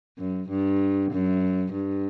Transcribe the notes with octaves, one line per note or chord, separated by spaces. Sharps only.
F#2
G2
F#2
G2